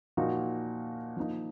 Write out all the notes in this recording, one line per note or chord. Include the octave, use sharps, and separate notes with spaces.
A#2 F3 A#3 D#4 F#4
F3 A#3 D#4